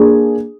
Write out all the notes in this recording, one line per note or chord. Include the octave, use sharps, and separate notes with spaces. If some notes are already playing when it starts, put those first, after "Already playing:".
Already playing: A#3 D4 G#4